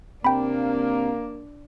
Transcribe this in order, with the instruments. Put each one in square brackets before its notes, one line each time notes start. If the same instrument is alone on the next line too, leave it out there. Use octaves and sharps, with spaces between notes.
[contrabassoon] C3 [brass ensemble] A#3 [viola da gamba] D4 [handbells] G5 B5